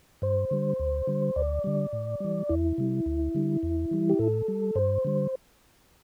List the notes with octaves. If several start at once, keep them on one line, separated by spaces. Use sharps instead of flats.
G2 C5
D3 G3
D2
D3 G3
D2 D5
D3 G3
A2
E3 G3
E2 E4
C3 G3
D2
D3 G3
E2
E3 G3
G4
A2 A4
G3
G2 C5
D3 G3